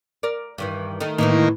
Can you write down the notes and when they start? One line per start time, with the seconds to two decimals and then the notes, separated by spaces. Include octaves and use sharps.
0.23 A#4 D5
0.58 G2 D#3 E3
1.01 D#3 A3 D#4
1.18 A2 D#3 E3 A#3 E4